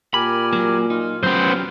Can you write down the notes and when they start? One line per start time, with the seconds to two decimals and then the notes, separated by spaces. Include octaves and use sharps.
0.14 A#2 G4 A#4 G#5 B5
0.53 F#3 A#3
0.90 D#4 F4
1.23 F#3 B3 C#4 G4 C5